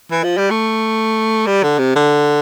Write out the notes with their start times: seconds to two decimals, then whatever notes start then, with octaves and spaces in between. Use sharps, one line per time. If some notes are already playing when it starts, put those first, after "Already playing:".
0.11 E3
0.24 F3
0.37 G3
0.50 A3
1.47 G3
1.63 D3
1.79 C3
1.96 D3